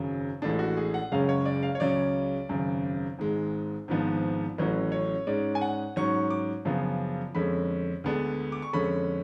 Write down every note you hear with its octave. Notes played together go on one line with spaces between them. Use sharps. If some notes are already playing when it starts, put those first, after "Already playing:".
Already playing: G#1 F#2 C#3 F#3
A1 A2 G#3 D4 G#4
F#4
G#4
F#5
F#1 F#2 C#3 G#3 C#4 F5
C#5
D5
F5
C#5
C#2 C#3 F#3 C#4 D5
G#1 F#2 C#3
G#1 G#2 G#3
G#1 G#2 F3 B3 D4
A1 A2 F#3 C#4 B4
C#5
G#2 G#3 C#4 D5
G#5
F#5
G#2 F#3 C#4 C#6
D6
F#2 C#3 F3 B3 D4
F2 D3 G#3 C#4 B5
D2 D3 G#3 B3 D4
D6
C#6
F2 D3 G#3 C#4 B5